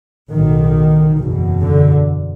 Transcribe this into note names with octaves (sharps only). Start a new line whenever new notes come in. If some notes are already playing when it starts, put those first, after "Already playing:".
B1 A2 D#3
F#1 E2 B2
D3